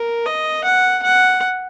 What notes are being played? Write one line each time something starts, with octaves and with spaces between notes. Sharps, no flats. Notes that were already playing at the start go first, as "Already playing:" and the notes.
Already playing: A#4
D#5
F#5
F#5